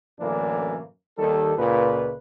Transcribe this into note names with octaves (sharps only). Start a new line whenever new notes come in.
F#2 A2 D3 E3 A#3 D4
D#2 D#3 G3 A4
C#2 A#2 B4